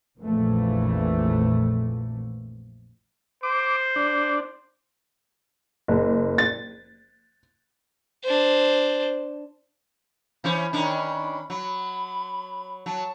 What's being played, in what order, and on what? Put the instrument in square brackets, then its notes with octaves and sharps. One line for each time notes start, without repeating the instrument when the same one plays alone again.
[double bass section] A#1 F2 A#2 E3 A3
[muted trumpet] C5 [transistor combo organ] D6
[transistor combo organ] D4
[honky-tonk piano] F#1
A6
[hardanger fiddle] D4 C5
[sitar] E3 C#4 C5 [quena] B5
[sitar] D#3 C#4 D4
[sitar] F#3 [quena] B5
[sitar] F#3 [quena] A5